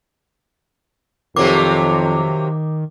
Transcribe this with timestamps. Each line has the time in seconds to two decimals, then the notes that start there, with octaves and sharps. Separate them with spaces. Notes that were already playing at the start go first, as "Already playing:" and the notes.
1.36 F2 C3 D#3 F#3 A#3 D6